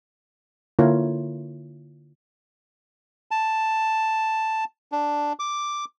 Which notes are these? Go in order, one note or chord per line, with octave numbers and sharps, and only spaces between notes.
D3 A#3 E4 F4 A#4 C#5
A5
D4
D6